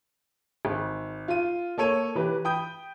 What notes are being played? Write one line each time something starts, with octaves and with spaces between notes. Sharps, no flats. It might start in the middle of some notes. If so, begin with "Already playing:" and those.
G#1
F4 D#7
A#3 A4 C#5 D#7
E3 G4 B4
G5 B5 D#6 G6